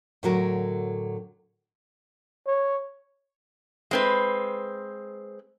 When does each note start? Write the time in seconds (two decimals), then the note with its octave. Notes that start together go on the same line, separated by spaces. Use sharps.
0.23 A2 D3 F#3 F#4 A#4
2.47 C#5
3.91 G#3 C4 B4